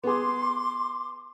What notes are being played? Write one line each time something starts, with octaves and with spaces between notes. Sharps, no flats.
B3 G#4 C6 D6